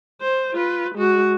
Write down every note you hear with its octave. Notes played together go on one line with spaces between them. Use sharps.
C5
F4 B4
G#3 F#4